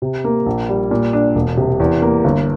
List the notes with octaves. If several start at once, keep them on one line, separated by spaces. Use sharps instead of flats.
C3
A#3
A#1
G3
A#2
D4
E1
C3
E2
A#3
G1